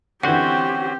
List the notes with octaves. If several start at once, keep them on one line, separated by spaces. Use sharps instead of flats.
D3 E3 C4 C#4 F#4 G4 C5 F#5